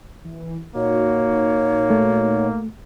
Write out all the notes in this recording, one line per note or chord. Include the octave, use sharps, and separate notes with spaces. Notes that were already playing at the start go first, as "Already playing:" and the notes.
E3
A#2 A#3 D#4 F#4 C#5
A3